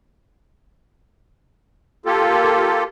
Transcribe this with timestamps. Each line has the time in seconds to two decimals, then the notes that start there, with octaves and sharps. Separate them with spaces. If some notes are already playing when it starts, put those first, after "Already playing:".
2.06 A#3 F4 G4 A4